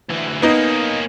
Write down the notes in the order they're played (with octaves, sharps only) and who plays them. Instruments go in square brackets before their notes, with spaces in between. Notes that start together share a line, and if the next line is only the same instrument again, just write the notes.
[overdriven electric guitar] D2 E3
[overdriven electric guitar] A#3 C#4 [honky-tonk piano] B3 D#4